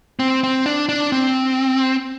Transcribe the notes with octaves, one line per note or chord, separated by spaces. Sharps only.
C4
C4
D4
D4
C4